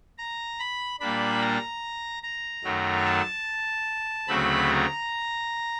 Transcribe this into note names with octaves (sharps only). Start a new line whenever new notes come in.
A#5
B5
A#2 G3 A#3 D4 B5
A#5
A#5
F#2 D#3 F#3 A3
A5
D2 C#3 F#3 A3 C4 B5
A#5